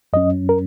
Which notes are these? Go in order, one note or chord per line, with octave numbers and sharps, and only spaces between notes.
F#2 F#3 C#4 D#5
A#4